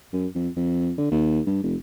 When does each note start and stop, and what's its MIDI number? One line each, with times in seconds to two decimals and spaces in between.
0.13 0.26 42
0.35 0.49 41
0.56 0.91 41
0.98 1.11 50
1.11 1.40 39
1.46 1.62 43
1.63 1.75 29